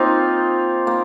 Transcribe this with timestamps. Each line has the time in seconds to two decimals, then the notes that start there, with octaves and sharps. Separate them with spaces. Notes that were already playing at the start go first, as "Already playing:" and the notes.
Already playing: A#3 C4 D#4 F4
0.87 A#3